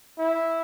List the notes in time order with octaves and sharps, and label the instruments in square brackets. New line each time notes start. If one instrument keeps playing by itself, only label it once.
[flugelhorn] E4